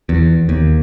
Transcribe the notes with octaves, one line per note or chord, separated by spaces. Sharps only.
E2
D#2